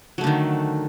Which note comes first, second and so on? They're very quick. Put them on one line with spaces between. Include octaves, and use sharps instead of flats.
F#3 A3 D3 D#3